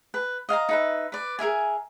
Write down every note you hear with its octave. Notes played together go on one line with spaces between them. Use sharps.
B4
D#5 F5 G#5 A#5
D#4 B4 E5
B4 D5
G#4 A#4 E5 G#5